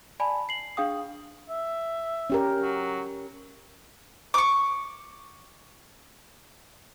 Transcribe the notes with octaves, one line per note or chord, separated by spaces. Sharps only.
D5 G#5 A5 B5
C7 F#7
D4 G#4 F5 G5 D#6
E5
C#4 G4 A#4
F#3
C#6 D6